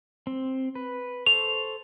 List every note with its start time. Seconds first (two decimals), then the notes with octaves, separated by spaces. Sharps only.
0.27 C4
0.75 B4
1.26 A4 C5 C#6 F7